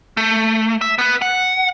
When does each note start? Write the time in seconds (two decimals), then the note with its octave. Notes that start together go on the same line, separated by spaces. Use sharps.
0.17 A3
0.81 E5
0.99 B3 B4
1.22 F#5